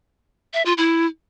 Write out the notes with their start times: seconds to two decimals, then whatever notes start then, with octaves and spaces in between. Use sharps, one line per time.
0.54 E5
0.65 F4
0.77 E4